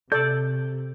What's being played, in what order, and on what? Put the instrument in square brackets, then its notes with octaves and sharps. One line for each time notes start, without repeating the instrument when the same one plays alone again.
[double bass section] C3 [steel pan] A4 D5 [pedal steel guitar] G6